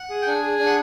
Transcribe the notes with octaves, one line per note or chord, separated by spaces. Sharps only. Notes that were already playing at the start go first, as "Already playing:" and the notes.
Already playing: F#5
G#4
G5
D4 G#5
G#4
D4
F#5